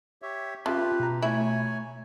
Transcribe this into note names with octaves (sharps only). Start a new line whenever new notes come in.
G4 C#5 E5
C#3 F4 G4 B4 E5 A5 C6
B2 A#5
A3 E4 C#5 G#5